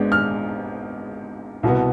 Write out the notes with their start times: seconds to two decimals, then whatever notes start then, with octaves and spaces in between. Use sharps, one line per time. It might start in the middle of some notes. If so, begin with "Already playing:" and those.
Already playing: G#1 G#2 G#3 B3 D4
0.12 F6
1.63 C2 B2 B3